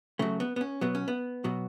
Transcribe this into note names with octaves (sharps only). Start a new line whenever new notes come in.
C#3 F#3 A3
B3
B3
C#4
B2 F#3 B3
C#4
B3
B2 F#3